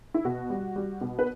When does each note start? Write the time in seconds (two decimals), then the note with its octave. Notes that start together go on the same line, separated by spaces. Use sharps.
0.14 E4
0.25 B2 F#4
0.50 G3
0.76 G3
1.01 B2
1.19 B4